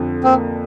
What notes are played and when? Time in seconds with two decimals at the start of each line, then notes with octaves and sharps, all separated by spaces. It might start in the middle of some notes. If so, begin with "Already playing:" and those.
Already playing: F2 D3
0.24 A#3 C4